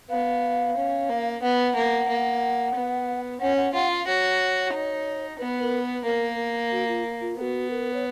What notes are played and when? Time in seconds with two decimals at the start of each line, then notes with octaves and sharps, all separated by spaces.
0.10 B3 F5
0.77 C#4
1.09 A#3
1.42 B3 F#5
1.76 A#3
2.09 A#3
2.74 B3
3.40 C#4 F#5
3.57 F#5
3.74 F4 F#5
3.91 F5
4.07 F#4 C#5
4.73 D#4
5.39 B3 B4
5.62 A#4
5.83 B4
6.05 A#3 A#4
6.72 F#4
6.88 F4
7.21 F4
7.37 B3 A#4
7.41 F#4
7.70 A#4
7.94 C#5